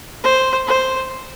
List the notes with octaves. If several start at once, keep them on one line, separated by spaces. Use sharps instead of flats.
C5
C5